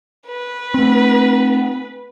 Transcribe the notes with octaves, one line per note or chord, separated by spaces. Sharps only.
B4
A3 C4